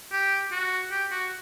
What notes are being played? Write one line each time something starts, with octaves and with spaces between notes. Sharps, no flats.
G4
F#4
G4
F#4